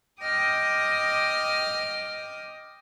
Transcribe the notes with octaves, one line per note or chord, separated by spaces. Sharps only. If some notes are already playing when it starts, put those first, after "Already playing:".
D#5 G5 D6 D#6 F6